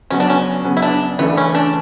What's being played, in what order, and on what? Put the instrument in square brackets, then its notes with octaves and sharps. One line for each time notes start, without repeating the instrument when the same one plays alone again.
[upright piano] C#3 F#3 B3 [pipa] C#4
[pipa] D4
C#4
[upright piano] C#3 F#3 B3
[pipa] E4
D4
[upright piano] C#3 E3 A3 D4 [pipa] B3
[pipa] C#4
D4